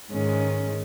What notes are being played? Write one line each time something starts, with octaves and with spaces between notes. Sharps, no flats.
G#2 D#3 G#3 C#4